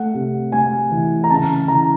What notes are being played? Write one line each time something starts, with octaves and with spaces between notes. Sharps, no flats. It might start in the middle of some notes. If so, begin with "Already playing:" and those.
Already playing: A3 F#5
C3
A3 G#5
E3
A#5
C#3 A5
E3 A#5